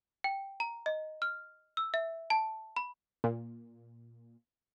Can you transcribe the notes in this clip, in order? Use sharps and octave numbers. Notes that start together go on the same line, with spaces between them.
G5
A#5
D#5
F6
E6
E5
A5
B5
A#2